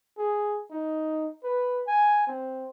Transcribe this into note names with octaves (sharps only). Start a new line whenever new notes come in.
G#4
D#4
B4
G#5
C4